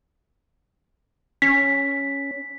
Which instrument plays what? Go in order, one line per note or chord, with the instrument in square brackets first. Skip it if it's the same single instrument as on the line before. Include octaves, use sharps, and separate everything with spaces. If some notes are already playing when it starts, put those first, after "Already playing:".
[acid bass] C#4 [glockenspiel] B6